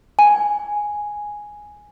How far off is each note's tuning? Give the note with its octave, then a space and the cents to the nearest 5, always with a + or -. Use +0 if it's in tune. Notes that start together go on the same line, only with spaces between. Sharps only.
G#5 +0